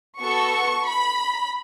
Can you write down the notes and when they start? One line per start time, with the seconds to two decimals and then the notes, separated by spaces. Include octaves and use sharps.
0.19 B3 F#4 A4 C#6
0.85 B5